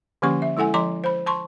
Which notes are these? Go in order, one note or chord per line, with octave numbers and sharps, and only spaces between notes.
D3 F3 A#3 C#4 G4 C#6
E5
G#3 E4 A4 F#5 G#5
F3 D#5 A#5 C6 D6
C5 B5
A5 C6 C#6